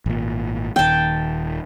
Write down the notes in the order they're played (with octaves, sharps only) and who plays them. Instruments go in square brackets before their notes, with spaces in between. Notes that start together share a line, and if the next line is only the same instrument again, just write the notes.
[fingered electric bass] G#1 A#2
[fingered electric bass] D#1 D#3 [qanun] G5 A5